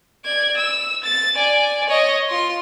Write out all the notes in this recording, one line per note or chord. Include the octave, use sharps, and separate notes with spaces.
D5 G#6
E6
A6
D5 G#5
C#5 D#5
F4 C6